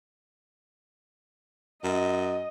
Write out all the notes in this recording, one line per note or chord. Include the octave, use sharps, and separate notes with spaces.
F#2 D#5